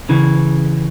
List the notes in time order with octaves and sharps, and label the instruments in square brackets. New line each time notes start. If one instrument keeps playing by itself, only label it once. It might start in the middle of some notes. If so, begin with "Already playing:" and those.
[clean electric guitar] C#3 E3